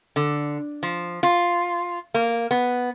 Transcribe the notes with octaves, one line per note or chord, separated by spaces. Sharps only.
D3
F3
F4
A#3
B3